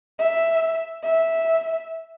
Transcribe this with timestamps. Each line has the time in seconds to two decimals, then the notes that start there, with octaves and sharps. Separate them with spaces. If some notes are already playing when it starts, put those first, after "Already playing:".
0.19 E5
1.04 E5